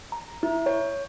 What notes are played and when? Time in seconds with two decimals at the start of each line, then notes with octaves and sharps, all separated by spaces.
0.12 A#5
0.43 E4
0.66 C#5